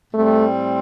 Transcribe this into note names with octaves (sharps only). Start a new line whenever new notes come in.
A2 G3 A3 C4